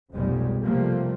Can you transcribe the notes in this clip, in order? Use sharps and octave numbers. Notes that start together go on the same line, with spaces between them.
F1 B1 F2 G3 G#3
C3 F3 G3 A3 A#3